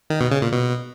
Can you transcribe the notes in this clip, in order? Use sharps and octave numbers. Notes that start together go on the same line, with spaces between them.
D#3
B2
C#3
A#2
B2